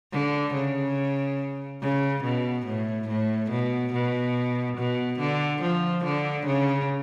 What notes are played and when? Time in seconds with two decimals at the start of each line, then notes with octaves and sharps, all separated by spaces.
0.12 D3
0.54 C#3
1.81 C#3
2.24 B2
2.66 A2
3.08 A2
3.50 B2
3.93 B2
4.77 B2
5.19 D3
5.62 F3
6.04 D3
6.47 C#3